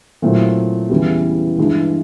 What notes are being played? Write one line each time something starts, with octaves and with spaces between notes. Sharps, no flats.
A#2 F#3 A3 C4 E4
E2 C#3 E3 G3
G2 E3 G#3